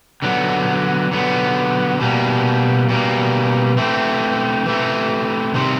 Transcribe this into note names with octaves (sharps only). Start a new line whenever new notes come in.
D3 F#3 B3
D3 F#3 B3
B2 G3 A#3
B2 G3 A#3
E3 A3 C4
E3 A3 C4
C3 D#3 G3 C4